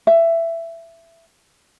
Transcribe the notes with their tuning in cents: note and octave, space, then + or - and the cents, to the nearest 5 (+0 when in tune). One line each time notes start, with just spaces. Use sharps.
E5 +15